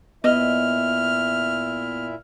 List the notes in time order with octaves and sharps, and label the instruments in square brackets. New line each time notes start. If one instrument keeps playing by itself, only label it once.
[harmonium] A#2 E4 E5 [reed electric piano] B3 [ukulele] D#5 [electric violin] F6